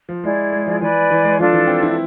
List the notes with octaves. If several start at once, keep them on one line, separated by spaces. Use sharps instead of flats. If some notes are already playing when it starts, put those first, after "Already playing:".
F3
G#3 E4 G#4 D5
G#3
F3
E3 B4 D5 G#5
E3
G#3
F3 D4 F4 A4
E3
C4
E4